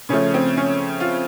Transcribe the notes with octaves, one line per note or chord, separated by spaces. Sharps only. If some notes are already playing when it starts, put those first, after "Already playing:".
C#3 F3 A3 C#4
C4
C#4
F4